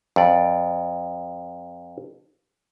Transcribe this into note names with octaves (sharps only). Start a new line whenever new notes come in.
F2 D5